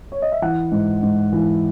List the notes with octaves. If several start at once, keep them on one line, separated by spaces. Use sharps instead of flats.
C#5
D#5
E5
E3 F#5
G#2
G#2
E3